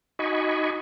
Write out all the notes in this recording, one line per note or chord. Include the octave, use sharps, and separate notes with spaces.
D#4 F#4 D#5 G#5 B5 C#6